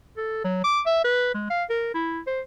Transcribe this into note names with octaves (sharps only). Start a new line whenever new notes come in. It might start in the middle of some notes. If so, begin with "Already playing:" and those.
A4
F#3
D6
E5
B4
G#3
F5
A#4
E4
C5